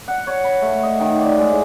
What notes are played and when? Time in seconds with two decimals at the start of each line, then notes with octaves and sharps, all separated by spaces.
0.08 F#5
0.27 C#5
0.44 B5
0.62 A3
0.83 D#5
1.00 D#3
1.21 D5
1.38 G#3
1.51 A2